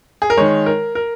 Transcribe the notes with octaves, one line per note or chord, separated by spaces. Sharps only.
G#4
A#4
D#3 G#3 C#5
A#4
A#4